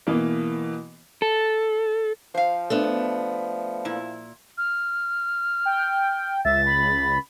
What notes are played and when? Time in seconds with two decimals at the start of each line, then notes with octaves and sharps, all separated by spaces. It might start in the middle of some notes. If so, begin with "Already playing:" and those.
0.07 B2 E3 A#3
1.22 A4
2.35 F3 C5 F5
2.70 A3 B3 D4
3.85 A#2 E4
4.58 F6
5.65 G5
6.45 C#2 E5 A6
6.66 B5